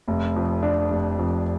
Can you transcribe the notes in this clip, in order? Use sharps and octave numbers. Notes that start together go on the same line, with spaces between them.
F1
F2
D4
F1
F2